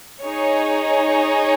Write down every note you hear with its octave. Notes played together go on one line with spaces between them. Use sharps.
D#4 G#4 C#5